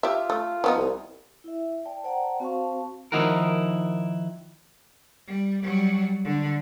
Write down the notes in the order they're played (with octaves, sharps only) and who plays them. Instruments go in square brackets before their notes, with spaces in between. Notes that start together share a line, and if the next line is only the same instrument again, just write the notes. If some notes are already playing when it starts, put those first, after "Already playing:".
[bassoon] F4 [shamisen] G4 E5
[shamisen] A3
F3 B3 D#4
[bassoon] C2
[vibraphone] E4 E5
D5 G5 A5
C5 D5 F#5 G5 A5 A#5
C4 F#4 C5 F5 A5 C#6
[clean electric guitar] D#3 F3 D#4 E4 F#4 A#4
[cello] G3
F#3 G3
D3